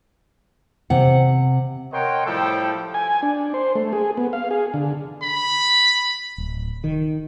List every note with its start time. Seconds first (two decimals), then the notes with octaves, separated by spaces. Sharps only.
0.90 C3 F#5
1.93 A#4 C#5 D#5 F#5 G5 C6
2.26 A2 F3 G3 E4 A4 G5
2.94 G#5
3.22 D4
3.54 C5
3.75 A3
3.93 G#4
4.17 B3
4.33 F5
4.51 G#4
4.74 D3
5.23 B5
6.38 D1
6.84 D#3